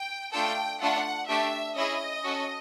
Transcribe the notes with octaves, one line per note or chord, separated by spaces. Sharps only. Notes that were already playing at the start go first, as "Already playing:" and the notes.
Already playing: G5
A3 D4 F4 A4 G5
A3 D4 F4 A4 F#5
A3 D4 G4 E5
C#4 E4 G#4 D#5
C#4 F#4 A4